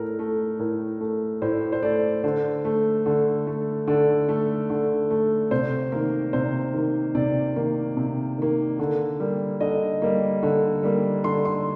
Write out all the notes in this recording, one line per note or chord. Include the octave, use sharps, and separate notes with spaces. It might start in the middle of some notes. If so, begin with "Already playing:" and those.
Already playing: A2 A3 A#4
A3
A2 A#4
A3
A2 C5
C5
A3 D5
D3 C5
A3
D3
A3
D3 D5
A3
D3
A3
C3 C5
D#3 A#3 A#4
C3 C5
D#3 A#3
C3 D5
D#3 A#3
C3
D#3 A#3
D3
G3 A#3
D3 D#5
G3 A#3
D3
G3 A#3
D3 C6
C6